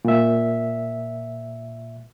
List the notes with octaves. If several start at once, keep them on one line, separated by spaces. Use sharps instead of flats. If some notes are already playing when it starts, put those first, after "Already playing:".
A#2 E5